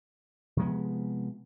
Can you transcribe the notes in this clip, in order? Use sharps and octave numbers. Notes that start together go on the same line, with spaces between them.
C3 F3 G#3 B3